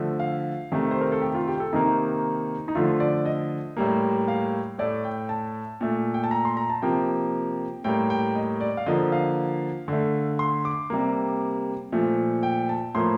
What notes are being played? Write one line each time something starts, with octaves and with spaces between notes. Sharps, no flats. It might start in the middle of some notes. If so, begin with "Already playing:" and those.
Already playing: D3 F3 A3
F5
C3 D#3 A3
C5
A#4
A4
G4
F4
G4
A4
C3 D#3 A#3 D#4
D#4
D3 F3 A3 F4
D5
D#5
A2 G3 A#3
F5
A2 A3 D5
G5
A5
A#2 A3
G5
A5
A#5
C6
A#5
A5
C3 F3 A#3 G5
A2 G3 A#3 G5
G5
D#5
D5
F5
D3 F3 A#3 D#5
F5
D3 A3
C6
D6
C3 G3 A#3
A#2 F3 A3
G5
A5
A2 F3 A#3 C6